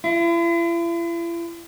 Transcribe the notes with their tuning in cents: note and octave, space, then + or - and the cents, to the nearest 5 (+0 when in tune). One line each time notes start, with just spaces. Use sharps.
E4 +45